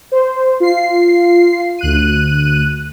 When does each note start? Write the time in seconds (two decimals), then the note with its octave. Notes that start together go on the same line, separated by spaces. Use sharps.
0.12 C5
0.60 F4 C7
1.79 D2 F#6 D#7